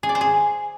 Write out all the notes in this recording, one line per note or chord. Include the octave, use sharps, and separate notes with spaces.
G#4
D5
C5
G#4